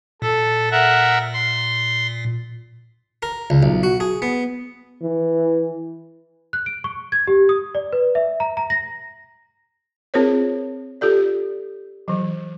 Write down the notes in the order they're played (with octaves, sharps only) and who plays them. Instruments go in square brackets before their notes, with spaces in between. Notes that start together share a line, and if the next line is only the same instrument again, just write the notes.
[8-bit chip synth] A#2 [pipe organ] A4
[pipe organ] A#4 E5 F#5
C6
[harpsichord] A#4
C#2
B1
F#4
G#4
B3
[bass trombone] E3
[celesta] F#6
D7
C#6
G#6
G4
D#6
D5
B4
E5
A#5
A#5
A#6
[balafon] C4 F4 G#4 A#4 C5 C#5
F4 G4 A4 D5
E3 F#3